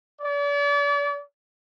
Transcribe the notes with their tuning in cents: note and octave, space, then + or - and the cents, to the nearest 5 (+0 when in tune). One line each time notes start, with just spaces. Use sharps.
D5 -40